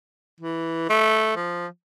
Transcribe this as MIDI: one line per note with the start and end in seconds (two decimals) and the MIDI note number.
0.41 0.89 52
0.89 1.32 57
1.36 1.67 53